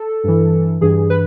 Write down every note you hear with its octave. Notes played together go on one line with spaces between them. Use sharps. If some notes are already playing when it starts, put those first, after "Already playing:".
Already playing: A4
G2 E3
G2 E3 G#4
B4